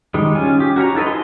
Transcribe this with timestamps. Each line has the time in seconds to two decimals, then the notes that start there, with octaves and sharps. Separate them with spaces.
0.14 D#3 G3 G#3
0.35 C#4 F4 G#5
0.60 G4
0.76 F#4 A#4 C#5 A#5
0.94 D#4 E4 A4 B4 D#5
1.07 F5 G#5 C6